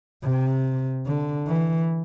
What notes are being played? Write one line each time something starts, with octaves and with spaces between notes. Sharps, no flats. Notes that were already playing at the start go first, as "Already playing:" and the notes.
C3
D3
E3